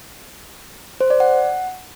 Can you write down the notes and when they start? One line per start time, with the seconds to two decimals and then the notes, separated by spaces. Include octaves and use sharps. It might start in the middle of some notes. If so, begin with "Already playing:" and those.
1.01 C5
1.10 D5
1.20 F#5